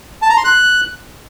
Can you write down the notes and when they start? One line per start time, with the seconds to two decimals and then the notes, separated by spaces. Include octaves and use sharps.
0.22 A5
0.29 A#5
0.37 C6
0.44 F#6